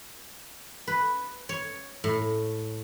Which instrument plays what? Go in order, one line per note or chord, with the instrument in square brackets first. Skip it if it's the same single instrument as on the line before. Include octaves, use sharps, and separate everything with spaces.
[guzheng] B4
C#5
A2